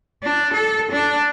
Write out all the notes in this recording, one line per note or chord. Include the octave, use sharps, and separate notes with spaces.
D4
A4
D4